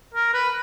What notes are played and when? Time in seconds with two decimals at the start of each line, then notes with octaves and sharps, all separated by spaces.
0.14 A#4
0.34 B4